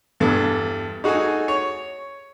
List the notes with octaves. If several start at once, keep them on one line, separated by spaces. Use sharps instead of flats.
E2 G2 A4
D#4 F#4 G#4 A4 G#5
C#5